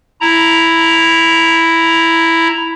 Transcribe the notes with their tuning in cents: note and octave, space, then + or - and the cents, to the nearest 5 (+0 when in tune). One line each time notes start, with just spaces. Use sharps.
E4 +0 A#5 +0